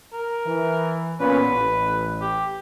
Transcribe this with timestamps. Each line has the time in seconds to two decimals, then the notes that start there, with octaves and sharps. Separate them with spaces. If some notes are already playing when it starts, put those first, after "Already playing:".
0.13 A#4
0.47 E3
1.20 A#2 B3 C#4 B4
1.51 A1
2.21 G4